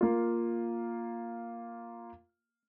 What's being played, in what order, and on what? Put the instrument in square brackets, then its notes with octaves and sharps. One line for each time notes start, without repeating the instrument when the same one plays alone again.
[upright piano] A#3 F4